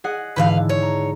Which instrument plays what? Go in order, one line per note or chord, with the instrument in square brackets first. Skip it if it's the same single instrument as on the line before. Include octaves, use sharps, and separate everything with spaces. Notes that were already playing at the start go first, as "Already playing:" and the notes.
[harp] G#4 D#5 F#5
[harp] G#2 D3 E3 [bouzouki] B4 C5 F5
[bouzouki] C#5
[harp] A#5